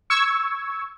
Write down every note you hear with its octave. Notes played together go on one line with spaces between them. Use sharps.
C#6 E6 G#6